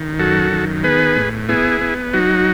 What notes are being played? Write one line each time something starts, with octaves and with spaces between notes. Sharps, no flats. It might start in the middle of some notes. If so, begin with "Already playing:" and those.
Already playing: D#3
F#2 F#4 A4
D#3
B3 G#4 B4
A2
B3 E4 G#4
B3
F#3 D#4 F#4